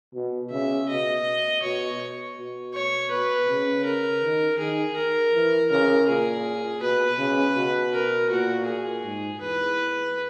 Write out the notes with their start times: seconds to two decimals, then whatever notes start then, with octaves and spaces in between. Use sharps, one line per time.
0.14 B2
0.51 C#3 E5
0.89 B2 D#5
1.62 B2 C#5
2.37 B2
2.74 C#5
3.10 B2 B4
3.48 C#3
3.85 A#4
4.22 D#3
4.59 D#3 G#4
4.96 A#4
5.33 E3
5.70 C#3 A#4
6.08 A#2 G#4
6.81 B2 B4
7.18 C#3
7.56 B2
7.93 A#4
8.30 A#2 F#4
8.66 G#4
9.04 G#2
9.41 E2 B4